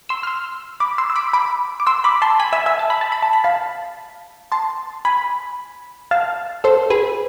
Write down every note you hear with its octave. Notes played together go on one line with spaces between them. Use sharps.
C6 E6
F6
C6 E6
B5 D6
C6 E6
E6
B5 D6
B5 D6
D6
C6 E6
B5 D6
A5 C6
G#5 B5
E5 G#5
E5 G#5
A5
B5
A5
B5
A5
B5
F5 A5
A5 C6
G#5 B5
F5 A5
A4 C5
G#4 B4